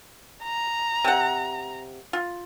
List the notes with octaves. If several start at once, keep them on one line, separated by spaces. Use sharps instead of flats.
A#5
C3 F#5
F4